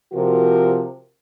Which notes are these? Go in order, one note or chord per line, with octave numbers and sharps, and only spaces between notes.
C3 F3 F#4 A#4